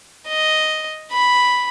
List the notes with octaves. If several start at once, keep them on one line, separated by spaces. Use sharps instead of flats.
D#5
B5